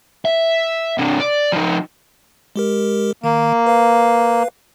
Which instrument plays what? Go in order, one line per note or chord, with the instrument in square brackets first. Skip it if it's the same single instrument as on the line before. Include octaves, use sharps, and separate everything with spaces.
[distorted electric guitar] E5
C3 D4
D5
F3 D#4
[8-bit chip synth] G#3 G4 A#4
[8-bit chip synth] D#3 [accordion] A#3
[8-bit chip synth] B4 F5